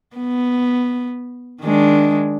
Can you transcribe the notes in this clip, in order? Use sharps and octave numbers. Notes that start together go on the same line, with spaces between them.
B3
D#3 G#3 D4